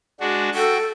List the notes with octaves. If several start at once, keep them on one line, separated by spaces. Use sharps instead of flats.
G#3 D4 F#4
F#4 A4 G5